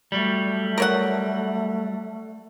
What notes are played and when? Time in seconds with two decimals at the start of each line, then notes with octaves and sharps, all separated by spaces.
0.12 F#3 G3 A3
0.78 A#4 C#5 F#5